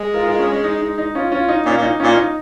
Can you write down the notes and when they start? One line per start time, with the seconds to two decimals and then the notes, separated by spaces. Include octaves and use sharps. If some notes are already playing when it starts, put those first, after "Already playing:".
Already playing: G#3
0.14 F4 A#4
0.26 F4 A#4
0.39 C#4
0.52 C#4
0.64 D#4
0.81 D#4
0.98 D#4
1.15 C#4 F4
1.32 C#4 F4
1.48 D#4
1.66 A#2 C#4
1.78 A#2
1.83 D#4
2.00 A#2 C#4 F4
2.16 D#4